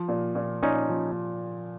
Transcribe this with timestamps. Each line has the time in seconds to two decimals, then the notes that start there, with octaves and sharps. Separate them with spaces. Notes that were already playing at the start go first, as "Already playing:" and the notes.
Already playing: F3
0.08 A#2
0.35 A#2
0.63 A#2 C#4 D#4
0.90 F3